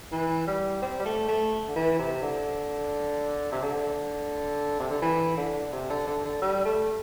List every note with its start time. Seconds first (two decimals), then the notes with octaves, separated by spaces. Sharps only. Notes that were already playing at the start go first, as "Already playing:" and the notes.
0.12 E3
0.47 G3
0.82 C4
1.00 G3
1.05 A3
1.28 A3
1.68 D3
1.76 E3
1.99 C3
2.22 D3
3.52 C3
3.62 D3
4.80 C3
4.91 D3
5.02 E3
5.37 D3
5.72 C3
5.90 D3
6.07 D3
6.25 D3
6.42 G3
6.65 A3